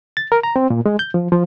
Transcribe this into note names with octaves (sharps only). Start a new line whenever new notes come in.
A6
A#4
A#5
C4
A#2
G#3
G6
F3
F3